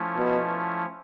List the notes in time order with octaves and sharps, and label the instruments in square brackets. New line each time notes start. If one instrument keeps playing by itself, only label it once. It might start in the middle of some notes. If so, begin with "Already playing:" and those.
Already playing: [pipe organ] F3 A3 C#4 E4
[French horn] B2